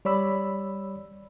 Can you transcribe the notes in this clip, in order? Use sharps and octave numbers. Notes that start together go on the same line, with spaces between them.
G3 C#5 D5 B5 E6